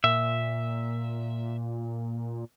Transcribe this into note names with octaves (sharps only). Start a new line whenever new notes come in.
A#2 E5